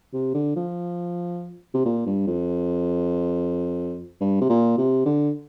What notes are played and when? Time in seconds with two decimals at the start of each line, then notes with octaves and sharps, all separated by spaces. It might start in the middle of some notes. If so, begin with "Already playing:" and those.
0.13 C3
0.34 D3
0.56 F3
1.74 C3
1.85 A#2
2.06 G2
2.27 F2
4.21 G2
4.41 C3
4.49 A#2
4.78 C3
5.05 D3